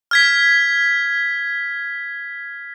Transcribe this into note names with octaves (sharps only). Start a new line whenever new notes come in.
F6 G#6 B6